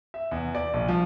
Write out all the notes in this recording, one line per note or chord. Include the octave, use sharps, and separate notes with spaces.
E5
E2
D5
A#1
F3